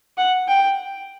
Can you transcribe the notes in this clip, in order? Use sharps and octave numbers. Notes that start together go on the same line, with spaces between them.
F#5
G5